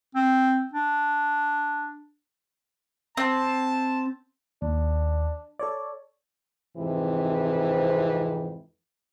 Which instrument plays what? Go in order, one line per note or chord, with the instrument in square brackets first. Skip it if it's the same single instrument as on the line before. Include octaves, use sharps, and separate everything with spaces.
[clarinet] C4
D4
[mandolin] C4 [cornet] A5
[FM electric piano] D#2 [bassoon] D4
[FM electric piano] A4 C#5 D5
[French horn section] F2 G#2 C3 E3